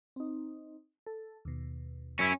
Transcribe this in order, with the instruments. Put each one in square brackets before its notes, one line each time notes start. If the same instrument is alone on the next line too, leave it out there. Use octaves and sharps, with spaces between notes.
[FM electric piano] C4 D#4
A4
D#2 B2
[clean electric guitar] F#2 E4 [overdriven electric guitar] C#4